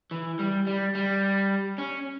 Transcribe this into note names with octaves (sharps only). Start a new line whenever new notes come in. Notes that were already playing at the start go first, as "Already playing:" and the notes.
E3
G3
G3
G3
C#4